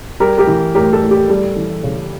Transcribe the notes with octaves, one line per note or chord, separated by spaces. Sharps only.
G3 G4 A#4
G4 A#4
E3
A2 G4 A#4
A4
A2
G4
G3 A4
E3
C#3